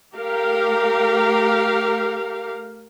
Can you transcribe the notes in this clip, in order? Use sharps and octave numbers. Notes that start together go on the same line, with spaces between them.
A3 G4 A#4 F5